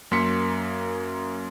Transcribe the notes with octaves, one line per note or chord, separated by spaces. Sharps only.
F#2 A#3 C6 B6 C#7